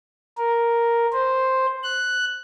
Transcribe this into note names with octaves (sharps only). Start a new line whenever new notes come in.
A#4
C5
F#6